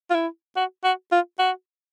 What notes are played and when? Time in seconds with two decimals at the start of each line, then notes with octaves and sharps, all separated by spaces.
0.10 F4
0.14 E4
0.56 F#4
0.84 F#4
1.12 F4
1.39 F#4